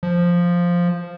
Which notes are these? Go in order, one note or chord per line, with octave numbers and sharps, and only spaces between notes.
F3